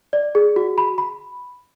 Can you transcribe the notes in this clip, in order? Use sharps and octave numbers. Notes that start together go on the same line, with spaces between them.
D5
G#4
F#4
B5
B5